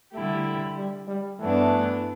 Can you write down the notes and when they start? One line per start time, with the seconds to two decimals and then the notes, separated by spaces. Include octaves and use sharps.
0.13 D3 G3 A3 E4 G4
0.76 G3
1.08 G3
1.39 G2 E3 A3 B3 D4